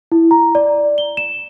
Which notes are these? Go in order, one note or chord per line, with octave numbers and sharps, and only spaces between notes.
E4
A#5
D5
G7
E7